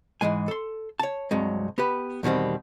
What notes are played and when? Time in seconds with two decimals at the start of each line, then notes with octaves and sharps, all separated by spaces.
0.21 G#2 C3 E3 G#3 G#5
0.48 A4 C6
1.00 C#5 A5
1.31 C2 G2 C3 F#3 G#3
1.78 B3 G4 B4
2.23 E2 B2 D#3 G3 C4